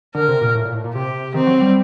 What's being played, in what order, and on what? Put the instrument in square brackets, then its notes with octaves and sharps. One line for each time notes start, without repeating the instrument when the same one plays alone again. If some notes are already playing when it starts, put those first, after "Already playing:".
[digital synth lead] D3 [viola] A#4
[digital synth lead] C3
A#2
A2
A#2
A2
A#2
[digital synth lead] C3 [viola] G4
[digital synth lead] D#3 [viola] C4
[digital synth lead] F#3
G3